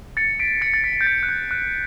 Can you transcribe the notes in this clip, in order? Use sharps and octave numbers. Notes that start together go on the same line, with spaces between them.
A6 C#7
B6 D7
A6 C#7
A6
B6
G6
A6
F#6
G6
F#6